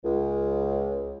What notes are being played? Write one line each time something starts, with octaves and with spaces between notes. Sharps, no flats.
C#2